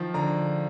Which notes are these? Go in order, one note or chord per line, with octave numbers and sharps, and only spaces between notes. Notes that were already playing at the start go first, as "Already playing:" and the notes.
Already playing: D#3 F3
D3 A#5